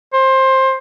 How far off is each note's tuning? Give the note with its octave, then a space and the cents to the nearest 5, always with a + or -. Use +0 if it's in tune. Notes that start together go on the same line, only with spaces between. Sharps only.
C5 +20